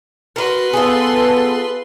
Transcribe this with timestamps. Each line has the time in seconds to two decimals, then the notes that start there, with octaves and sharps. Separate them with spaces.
0.36 F#4 A#4 B4 C6
0.73 B3 F4 G#4 A4